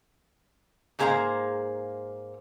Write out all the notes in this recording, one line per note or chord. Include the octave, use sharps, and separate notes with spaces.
G#2 A#3 G#4 C5 F5 A#5